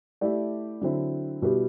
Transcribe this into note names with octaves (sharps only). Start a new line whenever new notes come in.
A3 E4 G4 D5
D3 F#3 C4 E4
B2 G3 B3 E4 G4